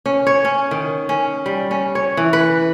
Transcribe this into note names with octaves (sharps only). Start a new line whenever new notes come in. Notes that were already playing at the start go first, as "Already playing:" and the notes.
C#4
C#5
C#4
D#3
C#4
G3
C#4
C#5
E3
B4